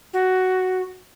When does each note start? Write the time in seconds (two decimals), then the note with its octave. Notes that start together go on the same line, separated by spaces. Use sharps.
0.13 F#4